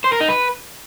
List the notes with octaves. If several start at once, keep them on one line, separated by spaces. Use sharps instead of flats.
C5
A#4
D#4
B4